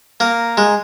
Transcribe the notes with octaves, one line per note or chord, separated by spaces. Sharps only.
A#3 A#5
G#3